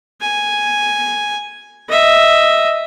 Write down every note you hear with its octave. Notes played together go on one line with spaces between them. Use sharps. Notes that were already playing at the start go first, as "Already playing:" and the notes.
G#5
D#5 E5